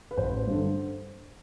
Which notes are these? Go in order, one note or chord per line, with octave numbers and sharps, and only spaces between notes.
B4
A1 C5
G2 D3